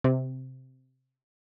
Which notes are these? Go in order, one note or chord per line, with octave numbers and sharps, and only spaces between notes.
C3